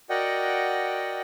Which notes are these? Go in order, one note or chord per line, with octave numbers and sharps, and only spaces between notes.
F#4 A#4 D5 D#5 F#5 G5